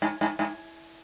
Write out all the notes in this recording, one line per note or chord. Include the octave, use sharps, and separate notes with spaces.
G#2
G#2
G#2